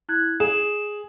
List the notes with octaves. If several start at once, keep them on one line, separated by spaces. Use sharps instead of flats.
E4 F#6 G#6
G#4 E7